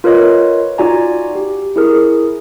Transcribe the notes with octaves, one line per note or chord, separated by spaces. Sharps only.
F4 A#4 B4 C#5 D#5
D#4 F4 F#4 D5 G#5 A#5
G4
E4 G#4 A#4